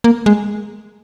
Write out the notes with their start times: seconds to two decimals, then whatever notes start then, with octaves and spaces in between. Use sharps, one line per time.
0.04 A#3
0.26 G#3